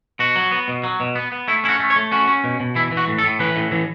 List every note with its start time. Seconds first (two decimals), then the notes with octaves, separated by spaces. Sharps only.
0.19 B2 F#4
0.35 F#3
0.51 B3
0.68 B2
0.84 F#3
1.00 B2
1.15 B3
1.32 B3
1.48 A3 E4
1.64 C#4 E4
1.69 F#4
1.80 A3
1.90 C#5
1.96 A3
2.12 C#4 F#4
2.27 C#4
2.44 B2
2.60 B2
2.75 E3 E4
2.91 E3
2.97 F#4
3.08 A2
3.18 A4
3.24 A2
3.39 E3 B4
3.56 A2
3.72 E3